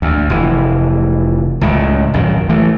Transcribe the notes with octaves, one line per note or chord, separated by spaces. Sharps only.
D2
F1 E3
C#2 A2 C#3
A#1 F#2 D#3
E3 A3